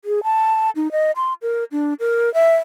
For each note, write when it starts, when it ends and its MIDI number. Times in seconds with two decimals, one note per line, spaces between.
0.05 0.23 68
0.23 0.70 81
0.76 0.91 63
0.92 1.11 75
1.16 1.33 84
1.42 1.64 70
1.72 1.94 62
2.00 2.32 70
2.34 2.56 76